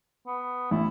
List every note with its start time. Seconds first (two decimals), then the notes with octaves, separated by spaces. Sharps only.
0.27 B3
0.71 A1 E4